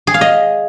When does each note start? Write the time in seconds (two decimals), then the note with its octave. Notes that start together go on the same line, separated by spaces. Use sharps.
0.07 G#4
0.14 F5
0.21 D#5